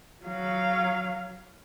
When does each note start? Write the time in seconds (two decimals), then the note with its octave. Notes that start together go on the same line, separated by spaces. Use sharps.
0.25 F#3 F5